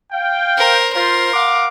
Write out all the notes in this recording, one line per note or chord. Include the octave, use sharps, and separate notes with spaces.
F5 G5
A#4 C5
F4 A#4 C5 C6
F5 F#5 D6